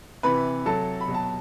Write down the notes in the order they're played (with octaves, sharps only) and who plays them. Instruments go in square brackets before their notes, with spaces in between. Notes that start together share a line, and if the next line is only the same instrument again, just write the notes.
[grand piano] C3 E3 B4 B5
C3 F#3 A4 A5
B5
B2 F#3
A5